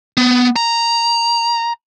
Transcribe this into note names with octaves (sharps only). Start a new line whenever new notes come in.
B3
A#5